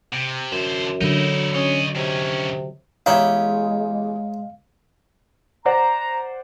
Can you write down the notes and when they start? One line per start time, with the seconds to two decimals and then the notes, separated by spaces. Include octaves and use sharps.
0.13 C3
0.52 F#2 D3 C5
1.01 D3 F#3 D#4 E4
1.55 C#4 C#5 D#5
1.96 C3 D#3 C#4
3.06 E2 G#3 D#4 E4 G4 C#5 F5
5.66 C5 D5 F#5 A#5